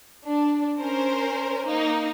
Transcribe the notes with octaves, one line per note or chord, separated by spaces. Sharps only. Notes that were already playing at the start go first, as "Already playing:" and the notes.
D4
C#4 A#4 C5
A#3 D#4